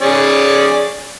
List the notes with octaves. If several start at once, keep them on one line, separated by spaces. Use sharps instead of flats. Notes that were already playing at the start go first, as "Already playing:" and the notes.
C#4 G#4 D5